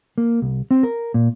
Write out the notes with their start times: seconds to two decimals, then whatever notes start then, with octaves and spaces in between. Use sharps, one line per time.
0.18 A#3
0.42 C2
0.71 C4
0.83 A#4
1.14 A#2